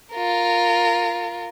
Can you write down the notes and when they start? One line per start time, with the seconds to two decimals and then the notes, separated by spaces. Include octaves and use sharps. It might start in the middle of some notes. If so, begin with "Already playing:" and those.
0.13 F4 A#4